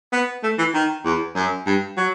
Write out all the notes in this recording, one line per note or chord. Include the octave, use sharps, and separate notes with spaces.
B3
A3
E3
D#3
E2
F#2
G2
F#3